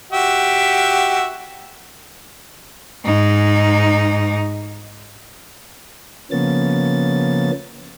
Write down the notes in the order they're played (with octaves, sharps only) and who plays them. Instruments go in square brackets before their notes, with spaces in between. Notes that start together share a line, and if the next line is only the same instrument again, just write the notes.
[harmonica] F#4 G4 E5
[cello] G#2 D#4
[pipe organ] C#3 F3 A#3 B3 C#4 A6